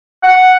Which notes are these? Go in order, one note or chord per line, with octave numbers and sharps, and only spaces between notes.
F#5